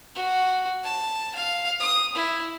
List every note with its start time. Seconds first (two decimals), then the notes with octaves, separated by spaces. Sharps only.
0.15 F#4
0.84 A5
1.35 F5
1.80 D#6
2.15 E4